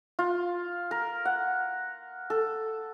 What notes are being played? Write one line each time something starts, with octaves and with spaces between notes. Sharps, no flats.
F4
A#4
F#5
A4